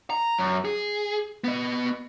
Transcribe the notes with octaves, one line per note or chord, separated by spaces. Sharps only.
A#5
F#2
G#4
B3 D#5